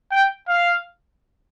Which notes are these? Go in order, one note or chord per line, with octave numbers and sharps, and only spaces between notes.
G5
F5